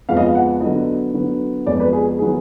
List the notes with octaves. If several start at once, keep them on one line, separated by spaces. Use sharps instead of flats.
F2 F3 G#3 B3 F5
D#5
F5
F#5
D3 F#3 B3 D#5
D3 F#3 B3
F2 F3 G#3 B3 D5
B4
G#4
D#3 F#3 B3 G#4